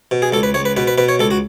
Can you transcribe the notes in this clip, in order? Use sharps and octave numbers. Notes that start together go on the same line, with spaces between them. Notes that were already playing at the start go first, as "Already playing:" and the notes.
B2
G#4
C#2 A4
B4
C#2 C#5
B4
B2 B4
B4
B2 B4
C#5
C#2 A4
F#4